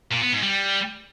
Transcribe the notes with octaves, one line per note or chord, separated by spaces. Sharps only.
A#2
B3
G#2
G3